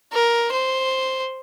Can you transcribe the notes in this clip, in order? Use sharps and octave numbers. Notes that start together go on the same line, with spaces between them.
A#4
C5